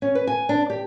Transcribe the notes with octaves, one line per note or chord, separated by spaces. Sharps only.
C#4
B4
G#5
D4
G4